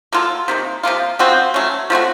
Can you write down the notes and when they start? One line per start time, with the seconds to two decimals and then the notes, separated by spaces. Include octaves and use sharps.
0.12 F#3 A#3 F4 A4
0.48 C3 D#3 A#3
0.83 C3 F3 A#3 F4
1.19 C#3 F3 C4 F#4
1.54 F#3 A3 C#4
1.90 F3 A3 C4 F#4